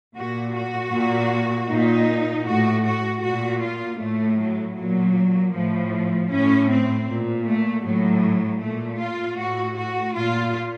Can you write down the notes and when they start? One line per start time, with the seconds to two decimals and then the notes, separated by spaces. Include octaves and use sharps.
0.16 A#2 F#4
0.55 F#4
0.93 A#2
1.69 A#2 D#4
2.46 A2 F#4
2.85 F#4
3.23 A#2 F#4
3.62 F4
4.00 A2 A3
4.39 F#3
4.77 A#2 F#3
5.54 A2 F3
6.31 A2 C#4
6.69 C4
7.07 A#2
7.46 A3
7.84 A2 F#3
8.61 A#2 A3
8.99 F4
9.37 A2 F#4
9.76 F#4
10.14 A#2 F4